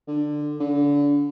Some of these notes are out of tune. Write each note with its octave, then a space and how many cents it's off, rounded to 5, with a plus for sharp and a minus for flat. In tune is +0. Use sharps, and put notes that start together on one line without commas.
D3 +15
D3 -30